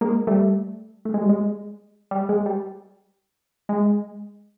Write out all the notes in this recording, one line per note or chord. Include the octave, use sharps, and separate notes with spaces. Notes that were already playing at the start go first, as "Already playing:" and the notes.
G#3 A#3
G3 A3
A3
G#3
G3
G#3
G3
G#3
G3
G#3